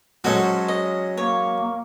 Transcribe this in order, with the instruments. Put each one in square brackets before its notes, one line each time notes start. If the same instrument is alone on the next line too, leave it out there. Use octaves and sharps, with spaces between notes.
[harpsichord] F#3 G#3 C#4 [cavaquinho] F#4 A4 C5
[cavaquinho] D#5
[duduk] A#3 [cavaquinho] C#5